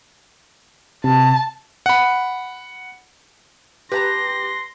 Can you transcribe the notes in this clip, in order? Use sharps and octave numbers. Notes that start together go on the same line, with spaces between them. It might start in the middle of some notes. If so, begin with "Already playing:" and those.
C3 A5
F#5 B5
G4 B4 A5 A#5 C6 A#6